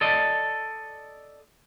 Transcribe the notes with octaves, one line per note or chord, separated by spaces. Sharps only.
A4 D5 D#5